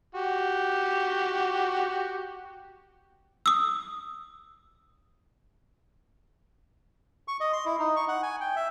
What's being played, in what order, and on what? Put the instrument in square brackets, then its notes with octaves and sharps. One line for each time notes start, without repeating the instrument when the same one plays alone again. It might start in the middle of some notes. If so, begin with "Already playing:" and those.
[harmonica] F#4 G4
[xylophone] D#6 E6
[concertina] C#6
D#5
C6
E4
D#4
C#6
F#5
G#5
G5
E5